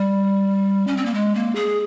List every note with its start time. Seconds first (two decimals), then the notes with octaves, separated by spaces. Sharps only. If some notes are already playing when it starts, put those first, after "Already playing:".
Already playing: G3
0.87 C#4
0.97 C4
1.05 A#3
1.14 G#3
1.35 A#3
1.55 G#4